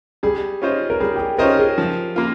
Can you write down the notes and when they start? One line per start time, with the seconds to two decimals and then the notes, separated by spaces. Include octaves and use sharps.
0.23 G3 G#4
0.62 C#4 F4 C5 D#5
0.90 A#4
1.00 G3 G#4
1.16 G4
1.19 G#4
1.38 C#4 F4 A#4 C5 D#5
1.58 G#4
1.78 F3
2.16 A#3 F4